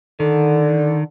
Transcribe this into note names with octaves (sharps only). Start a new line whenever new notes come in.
D3 D#3